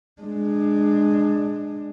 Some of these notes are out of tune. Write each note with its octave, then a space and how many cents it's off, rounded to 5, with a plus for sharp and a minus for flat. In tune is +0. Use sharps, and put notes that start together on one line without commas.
G#3 +0 D4 +20